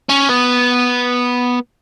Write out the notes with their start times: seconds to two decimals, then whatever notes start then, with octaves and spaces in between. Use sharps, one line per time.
0.10 C#4
0.30 B3